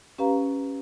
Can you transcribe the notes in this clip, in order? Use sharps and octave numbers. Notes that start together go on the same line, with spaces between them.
C#4 G4 B4 F5 A#5